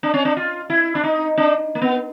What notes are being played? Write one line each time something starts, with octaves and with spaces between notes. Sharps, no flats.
D4
C#4
D4
F4
E4
D4
D#4
D4
A#3
B3